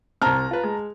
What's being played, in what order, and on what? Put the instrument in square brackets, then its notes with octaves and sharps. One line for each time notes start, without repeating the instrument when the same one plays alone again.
[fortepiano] C2 C4 [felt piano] A5 A#5 F6
[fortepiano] F4 B4
G#3